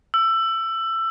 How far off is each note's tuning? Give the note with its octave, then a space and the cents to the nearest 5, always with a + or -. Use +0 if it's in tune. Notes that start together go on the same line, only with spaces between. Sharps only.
E6 +20